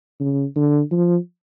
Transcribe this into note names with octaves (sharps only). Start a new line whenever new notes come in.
C#3
D3
F3